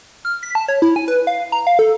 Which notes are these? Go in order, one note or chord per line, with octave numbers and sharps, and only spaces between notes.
F6
B6
A5
C#5
E4
G#5
B4
F5
A#5
F5
A4